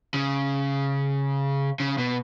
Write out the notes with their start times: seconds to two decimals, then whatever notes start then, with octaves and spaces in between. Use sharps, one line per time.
0.14 C#3
1.80 C#3
1.98 B2